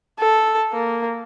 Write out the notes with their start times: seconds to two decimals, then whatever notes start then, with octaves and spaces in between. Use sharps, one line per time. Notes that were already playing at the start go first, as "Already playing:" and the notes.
0.20 A4
0.73 A#3